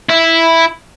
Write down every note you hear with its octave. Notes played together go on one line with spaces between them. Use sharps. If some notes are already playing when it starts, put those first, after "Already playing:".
E4 E5